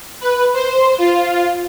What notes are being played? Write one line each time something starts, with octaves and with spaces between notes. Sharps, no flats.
B4
C5
F4